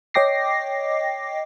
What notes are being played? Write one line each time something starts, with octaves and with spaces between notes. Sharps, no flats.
C#5 D#5 G5 D6 A#6 C7